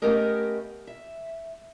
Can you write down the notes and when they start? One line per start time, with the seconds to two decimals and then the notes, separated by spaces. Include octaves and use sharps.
0.02 A3 B3 C#4 G4 A#4 D#5
0.87 E5